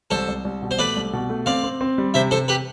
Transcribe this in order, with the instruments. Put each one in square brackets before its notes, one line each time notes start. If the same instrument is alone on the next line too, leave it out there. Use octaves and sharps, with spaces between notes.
[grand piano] C2 [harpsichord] A4 C5
[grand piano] C2
C2
B2
[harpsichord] C5
[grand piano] A3 [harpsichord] B4 D5
[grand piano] C2
B2
A3
[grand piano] C4 [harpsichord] D5 F5
[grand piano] C4
C4
G3
[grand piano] C3 [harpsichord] C5 E5
[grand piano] C3 [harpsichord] A4 C5
[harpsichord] G4 B4